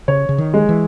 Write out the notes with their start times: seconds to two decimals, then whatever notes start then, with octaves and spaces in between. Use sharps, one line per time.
0.08 C#3 C#5
0.29 C#3
0.38 D#3
0.54 G#3
0.69 E3